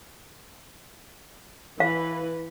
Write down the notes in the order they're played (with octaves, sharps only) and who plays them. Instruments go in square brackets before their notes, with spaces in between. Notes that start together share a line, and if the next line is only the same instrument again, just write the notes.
[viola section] E3 B4 [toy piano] F5